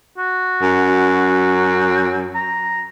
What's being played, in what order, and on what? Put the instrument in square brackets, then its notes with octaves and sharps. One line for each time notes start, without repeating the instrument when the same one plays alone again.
[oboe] F#4
[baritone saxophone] F#2
[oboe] A#5